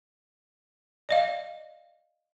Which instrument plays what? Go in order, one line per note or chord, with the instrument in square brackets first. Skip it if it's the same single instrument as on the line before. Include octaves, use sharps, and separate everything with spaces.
[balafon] D5 D#5 F5